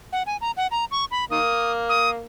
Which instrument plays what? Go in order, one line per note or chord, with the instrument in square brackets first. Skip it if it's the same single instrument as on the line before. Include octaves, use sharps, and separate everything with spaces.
[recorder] F#5
G#5
A#5
F#5
A#5
C#6
B5
[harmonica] D#3 A#3 [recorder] D#6
[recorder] D#6